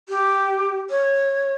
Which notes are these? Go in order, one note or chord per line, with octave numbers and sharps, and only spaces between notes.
G4
C#5